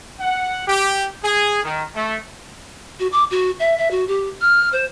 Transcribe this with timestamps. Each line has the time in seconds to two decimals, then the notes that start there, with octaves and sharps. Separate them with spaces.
0.20 F#5
0.68 G4
1.24 G#4
1.64 D#3
1.95 A3
2.99 F#4
3.12 D6
3.31 F#4
3.59 E5
3.78 E5
3.91 F#4
4.08 G4
4.41 F6
4.73 C5